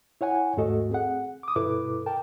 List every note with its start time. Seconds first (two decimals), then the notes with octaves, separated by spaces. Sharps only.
0.21 E4 C#5 F#5 G#5
0.57 D#2 G#2 A3 F#4 A4 D#5
0.91 C4 G#4 F#5
1.43 D6 D#6
1.56 G2 B2 E4 A4 B4 D6
2.06 A#4 G5 A5